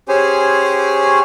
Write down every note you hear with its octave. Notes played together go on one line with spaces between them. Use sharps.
C#4 G4 G#4 C5 C#5 G#5